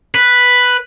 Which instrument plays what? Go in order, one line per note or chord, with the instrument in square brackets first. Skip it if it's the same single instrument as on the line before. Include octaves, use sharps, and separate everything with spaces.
[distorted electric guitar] B4